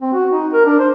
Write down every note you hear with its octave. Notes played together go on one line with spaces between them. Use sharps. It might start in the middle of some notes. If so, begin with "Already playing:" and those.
C4
F#4
D#4
A#4
D4
C5